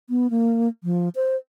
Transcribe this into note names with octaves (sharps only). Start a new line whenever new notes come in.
B3
A#3
F3
C5